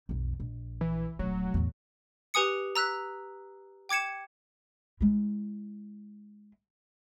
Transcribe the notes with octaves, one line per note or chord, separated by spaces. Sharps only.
B1 F2
A#1
E3
D#1 F#3 A3
E2 A2
G4 B4 G#5 D#6 C#7
A#5 E6 F#6 B6
G5 D6 G#6 C#7 E7
G#3 E4